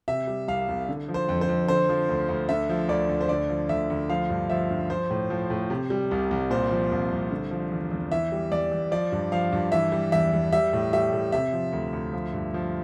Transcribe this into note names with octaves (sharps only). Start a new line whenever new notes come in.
C3 E5
G3
C2 F5
C2
D3
F3
C5
F2
C5
F2
D3 C5
F3
D2
D2
D3 E5
F3
D2 D5
D2
C5
D3 D5
F3
D2 E5
D2
F3 F5
G2
F3 E5
G2
F3 C5
A2
F3
A2
C3
G3
C2
C2
A#2 C5
F3
C2
C2
D3
F3
E2
E2
E3 E5
G3
E2 D5
E2
F3 D5
G2
F3 F5
G2
E3 E5
G3
E2 E5
E2
G3 E5
A2
G3 E5
A2
C3 E5
F3
D2
D2
F3
G2
F3